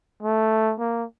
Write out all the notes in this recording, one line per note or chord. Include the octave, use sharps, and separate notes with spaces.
A3
A#3